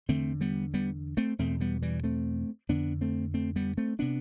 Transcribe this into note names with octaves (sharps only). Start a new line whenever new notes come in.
E2 D3 A3 C4
G3 B3
G3 B3
A3 C4
E2 B2 A3 C4
G3 B3
E3 G3
A3 C4
F2 D3 B3 D4
A3 C4
A3 C4
G3 B3
A3 C4
C3 B3 D4